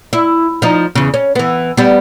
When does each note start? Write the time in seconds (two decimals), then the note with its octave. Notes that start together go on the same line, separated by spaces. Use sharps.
0.13 E4
0.62 F3 D#4
0.95 E2 C#3
1.14 C#4
1.35 E3 B3
1.77 G3 B3